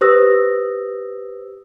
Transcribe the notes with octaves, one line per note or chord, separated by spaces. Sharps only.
G4 B4 C5 D#6 E6 A#6